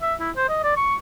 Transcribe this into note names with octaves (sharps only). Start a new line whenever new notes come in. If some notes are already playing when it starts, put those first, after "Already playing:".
E5
E4
C5
D#5
D5
C#6